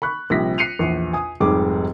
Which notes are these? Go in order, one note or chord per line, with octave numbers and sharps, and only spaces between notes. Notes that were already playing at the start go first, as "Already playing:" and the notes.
B5 C#6 F#6
A#1 C3 G3 A#6 B6
F#6 C7 C#7 D#7 F7
A#1 E2
G#5 D#6
F1 G#2 G3 G4 G#4 D6